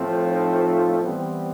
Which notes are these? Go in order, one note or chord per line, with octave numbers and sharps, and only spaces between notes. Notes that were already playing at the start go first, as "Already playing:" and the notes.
Already playing: A2 F3 A3 C4
D#4 F4
E3 G3 B3 C4